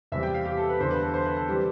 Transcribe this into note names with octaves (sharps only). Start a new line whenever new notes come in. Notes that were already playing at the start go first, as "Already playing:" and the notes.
E2 C3 G3 E5
G5
F5
G4
A4
B4
E2 D3 G3 C5
B4
A4
C5
B4
A4
E3 G3 C4 G4